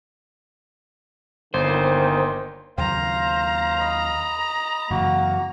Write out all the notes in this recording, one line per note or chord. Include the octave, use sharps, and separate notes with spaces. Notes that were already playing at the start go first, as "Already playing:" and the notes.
G1 A#2 D#3 C5
D#2 C#3 F#3 C5 F5 A#5
D#5 B5
F#2 C#3 E3 A#3 F#4